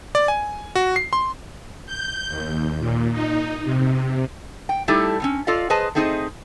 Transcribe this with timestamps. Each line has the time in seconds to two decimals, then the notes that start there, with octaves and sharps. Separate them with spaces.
0.15 D5
0.28 G#5
0.75 F#4
0.96 C7
1.13 C6
1.86 G6
2.28 D#2
2.79 A#2
3.12 D#4
3.63 C3
4.69 G5
4.88 G3 A3 D#4 E4 G4 A4
5.20 A2 C4 C#4
5.47 F4 A4 D5 D#5 F5
5.70 G#4 B4 C5 D#5 A5
5.95 A3 C4 D#4 G#4 C5 D#5